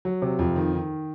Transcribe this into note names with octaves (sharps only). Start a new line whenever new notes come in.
F#3
C3
F2
D#3
D#3